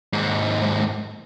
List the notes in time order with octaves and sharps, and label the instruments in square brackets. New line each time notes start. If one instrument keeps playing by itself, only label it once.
[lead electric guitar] D#2 G#2